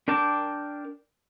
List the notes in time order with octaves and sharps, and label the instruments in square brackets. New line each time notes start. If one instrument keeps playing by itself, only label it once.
[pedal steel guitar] D4 A#4 G5 A5 D6